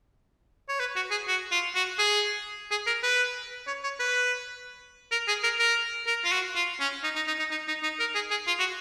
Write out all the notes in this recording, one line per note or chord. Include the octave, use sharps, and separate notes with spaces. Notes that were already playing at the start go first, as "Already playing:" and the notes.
C#5
B4
F#4
G#4
F#4
F4
F#4
G#4
G#4
A#4
B4
C#5
C#5
B4
A#4
G#4
A#4
A#4
A#4
F4
F#4
F4
C#4
D#4
D#4
D#4
D#4
D#4
D#4
D#4
A#4
G#4
G#4
F4
F#4